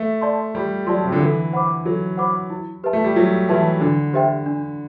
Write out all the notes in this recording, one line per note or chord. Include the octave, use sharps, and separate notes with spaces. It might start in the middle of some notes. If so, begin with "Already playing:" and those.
Already playing: A3
D5 A5 C6
G3 G4
F#3 D5 A5 C6
C3
D3
E3 A4
C5 F#5 B5 D6
F#3 A4
C5 F#5 B5 D6
E4
G4 B4 E5 A5
A3
G3
F#3 E4
E3 G4 B4 E5 A5
D3 D4
G4 C5 E5 G5
D4